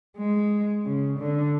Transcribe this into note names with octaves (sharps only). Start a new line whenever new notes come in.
G#3
C#3
D3